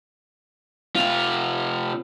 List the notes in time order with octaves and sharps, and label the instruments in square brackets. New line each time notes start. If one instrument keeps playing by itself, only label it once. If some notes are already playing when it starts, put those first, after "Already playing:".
[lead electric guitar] C3 F4